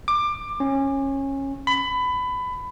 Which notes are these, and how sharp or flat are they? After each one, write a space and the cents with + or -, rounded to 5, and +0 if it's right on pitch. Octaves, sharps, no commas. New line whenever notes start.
D6 +20
C#4 -20
B5 +20